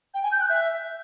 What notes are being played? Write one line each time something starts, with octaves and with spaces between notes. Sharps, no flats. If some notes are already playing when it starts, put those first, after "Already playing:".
G5
G#5
G6
F#6
E5